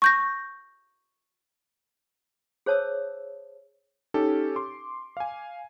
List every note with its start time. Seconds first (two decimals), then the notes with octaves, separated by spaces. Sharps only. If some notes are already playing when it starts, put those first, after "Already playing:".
0.02 C#6 G6 A#6
2.66 G#4 C5 C#5 A5 D#6 E6
4.14 C#4 D#4 G4 A4
4.56 C6 D6
5.17 F5 G#5